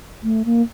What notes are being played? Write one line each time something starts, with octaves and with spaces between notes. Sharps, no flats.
A3
A#3